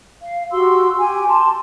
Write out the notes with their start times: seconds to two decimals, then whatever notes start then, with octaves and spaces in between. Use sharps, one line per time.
0.22 F5
0.52 F#4 G4 C6 E6
0.99 G4 G#5
1.28 A5 C6 D6